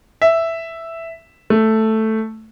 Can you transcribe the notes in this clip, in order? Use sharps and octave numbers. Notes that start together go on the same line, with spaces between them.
E5
A3